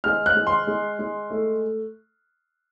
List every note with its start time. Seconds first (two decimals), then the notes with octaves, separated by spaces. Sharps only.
0.04 G#3 F6
0.26 F#6
0.35 G#3
0.47 C6
0.67 G#3
0.99 G#3
1.30 A3